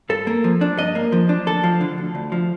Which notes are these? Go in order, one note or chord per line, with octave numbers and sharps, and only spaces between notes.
G2 A4
A#3
F3
D4
G2 D#5
A#3
F3
D4
D2 A4
F3
D3
D2
D2
F3